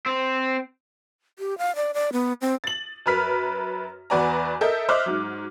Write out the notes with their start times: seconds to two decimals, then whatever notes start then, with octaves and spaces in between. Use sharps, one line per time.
0.06 C4
1.39 G4
1.58 F5
1.76 D5
1.94 D5
2.13 B3
2.41 C4
2.64 A6 F#7
3.06 F#2 A#4 B4 F6 B6
4.10 E2 F#4 B4 D5 G#5 A#5
4.61 A4 A#4 D#5 E5 G6
4.89 C5 D#5 E5 D6 F6 F#6
5.06 G#2 F#3